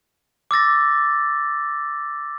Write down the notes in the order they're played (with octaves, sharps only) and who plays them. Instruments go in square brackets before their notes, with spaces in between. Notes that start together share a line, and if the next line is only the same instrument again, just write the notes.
[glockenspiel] D6 E6 A6 A#6